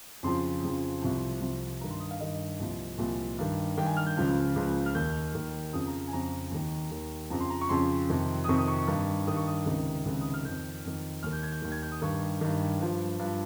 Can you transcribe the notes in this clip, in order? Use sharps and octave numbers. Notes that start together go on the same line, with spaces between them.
F2 C#3 F3 C6
F2 C#3 F3
C2 C3 F3
C2 C3 F3
G2 D#3 A#5
C6
D#6
F5
G2 D#3 D#5
C2 A#2 F3
C2 A#2 F3
G2 D#3
G2 D#3 G5
G#5
F6
G6
C#2 C#3 F3
C#2 C#3 F3
F6
D#2 D#3 G6
D#2 D#3
F2 C#3 F3 D#6
A#5
A#5
G#5
F2 C#3 F3 A#5
D#2 D#3
D#2 D#3
F2 C#3 F3 A#5
C6
A#5
C#6
F2 C#3 F3 C6
F2 C3 D#3
D#6
F2 C3 D#3 C#6
D#6
C#6
C#6
G2 D#3
G2 D#3 D#6
C#6
D#6
C#2 C3 D#3
C#2 C3 D#3
D#6
F6
F2 D#3 G6
F2 D#3
D#2 D#3 F6
G6
G#6
G6
D#2 D#3
G#6
G6
D#6
G2 D#3 C#6
G2 D#3
G2 F3
G2 F3